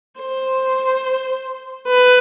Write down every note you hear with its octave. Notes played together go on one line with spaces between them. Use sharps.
C5
B4